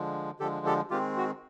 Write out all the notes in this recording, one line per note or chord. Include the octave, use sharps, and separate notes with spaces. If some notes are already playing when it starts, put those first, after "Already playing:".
Already playing: D3 F3 G#3
D3 F3 G#3 G4 A4
G4 A4
D#3 G#3 C4 F4 G4
F#4